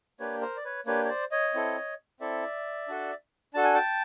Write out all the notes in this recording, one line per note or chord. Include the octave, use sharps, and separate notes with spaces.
A#3 D4 G4 B4 C#5
A#4 C5
D5
B4 C#5
A#3 D4 G4 B4 C#5
C#5
C5 D5
C#5 D#5
C4 E4 A4
C4 E4 A4 D5 E5
D4 F#4 A4
D4 F#4 A4 A5
G#5
G5 A5